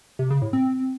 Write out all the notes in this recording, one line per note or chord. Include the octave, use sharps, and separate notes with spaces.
C3
C#3
A2
C4